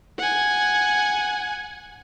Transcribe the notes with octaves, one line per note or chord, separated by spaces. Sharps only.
F#5 G#5